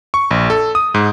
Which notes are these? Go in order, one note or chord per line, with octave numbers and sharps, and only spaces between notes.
C#6
A#1
A4
D#6
G#2